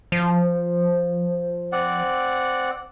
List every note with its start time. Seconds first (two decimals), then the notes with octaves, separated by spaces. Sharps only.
0.12 F3
1.72 C4 D5 F#5